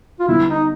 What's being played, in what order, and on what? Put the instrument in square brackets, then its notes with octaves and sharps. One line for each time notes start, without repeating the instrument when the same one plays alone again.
[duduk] F4
[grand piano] D3 G3 B3 [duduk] E4
[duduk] D#4